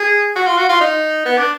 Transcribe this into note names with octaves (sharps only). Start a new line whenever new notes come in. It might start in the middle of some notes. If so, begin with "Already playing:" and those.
Already playing: G#4
F#4
F4
F#4
F4
D#4
B3
D4